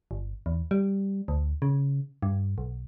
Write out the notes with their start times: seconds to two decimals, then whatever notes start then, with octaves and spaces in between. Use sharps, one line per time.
0.11 G1
0.46 E2
0.71 G3
1.28 D2
1.62 C#3
2.22 G2
2.58 B1